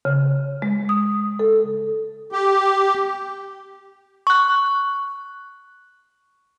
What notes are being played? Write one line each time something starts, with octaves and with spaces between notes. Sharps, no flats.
C#3
G#3
D#6
A4
G4
C#6 F#6